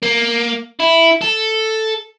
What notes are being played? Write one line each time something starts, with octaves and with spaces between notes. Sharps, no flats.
A#3
E4
A4